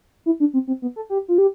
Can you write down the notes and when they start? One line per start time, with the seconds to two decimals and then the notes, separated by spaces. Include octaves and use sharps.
0.26 E4
0.40 D4
0.54 C4
0.67 C4
0.82 B3
0.96 A4
1.10 G4
1.28 F4
1.38 G4